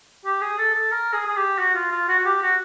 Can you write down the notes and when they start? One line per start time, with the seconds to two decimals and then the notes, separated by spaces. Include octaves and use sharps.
0.25 G4
0.41 G#4
0.59 A4
0.74 A4
0.91 A#4
1.13 G#4
1.27 G#4
1.36 G4
1.58 F#4
1.75 F4
1.91 F4
2.08 F#4
2.19 F#4
2.25 G4
2.42 F#4